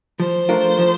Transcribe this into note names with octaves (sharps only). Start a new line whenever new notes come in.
F3 C5
A3 D4 F4 A#4
F3